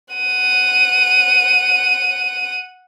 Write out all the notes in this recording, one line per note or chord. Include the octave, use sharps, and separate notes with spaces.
F#5 D#7